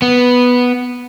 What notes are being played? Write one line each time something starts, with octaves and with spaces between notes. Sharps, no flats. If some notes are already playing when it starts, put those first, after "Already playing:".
B3